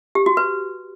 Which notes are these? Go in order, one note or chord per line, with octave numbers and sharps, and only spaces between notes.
G4
F#4
B4